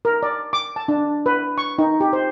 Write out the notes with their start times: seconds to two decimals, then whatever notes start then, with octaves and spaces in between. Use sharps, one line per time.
0.05 A#4
0.23 D5
0.53 D6
0.76 A5
0.88 D4
1.26 B4
1.58 C#6
1.79 D#4
2.01 G4
2.13 C5